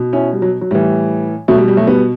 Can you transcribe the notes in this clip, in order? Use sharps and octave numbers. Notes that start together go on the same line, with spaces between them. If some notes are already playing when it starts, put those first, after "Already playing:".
Already playing: B2
C#4 E4
G3
F#3
F#3
A2 E3 G3
B2 F#3 A3
G3
G3
F#3 A3
G3 B3